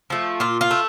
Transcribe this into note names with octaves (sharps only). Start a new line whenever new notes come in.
F3 A3
A#2 F4
F4
A3